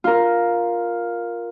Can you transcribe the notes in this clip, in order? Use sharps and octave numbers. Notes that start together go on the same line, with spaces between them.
F4 A#4